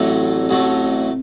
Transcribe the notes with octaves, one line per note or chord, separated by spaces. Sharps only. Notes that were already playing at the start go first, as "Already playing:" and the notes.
Already playing: A1 A2 F#3 A3 C4
A1 A2 F#3 A3